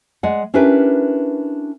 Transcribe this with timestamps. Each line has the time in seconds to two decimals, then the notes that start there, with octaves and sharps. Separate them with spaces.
0.23 G#3 D5 F#5
0.54 C#4 D4 E4 G4 A#4 B4